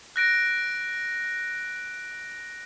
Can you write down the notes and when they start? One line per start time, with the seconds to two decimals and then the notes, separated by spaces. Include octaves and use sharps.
0.16 F#6 A#6 D7